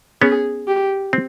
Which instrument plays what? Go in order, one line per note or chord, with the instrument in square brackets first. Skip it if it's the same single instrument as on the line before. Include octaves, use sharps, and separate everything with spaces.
[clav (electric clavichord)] B3 C#4 [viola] G#4
[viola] G4
[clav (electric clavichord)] C4